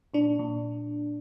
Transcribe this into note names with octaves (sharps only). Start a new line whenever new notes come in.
A#2 D4
A#2